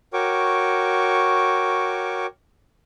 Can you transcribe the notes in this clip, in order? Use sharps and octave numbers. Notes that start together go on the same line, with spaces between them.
F#4 A#4 C#5 G5 C#6 D6